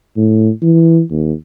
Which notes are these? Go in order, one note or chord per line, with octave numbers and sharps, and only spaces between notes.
A2
E3
D#2